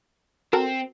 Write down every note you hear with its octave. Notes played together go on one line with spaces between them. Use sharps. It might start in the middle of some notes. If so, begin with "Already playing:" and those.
C4 F#4 A4 A#4